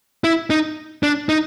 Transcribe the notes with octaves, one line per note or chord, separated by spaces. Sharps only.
E4
D#4
D4
D#4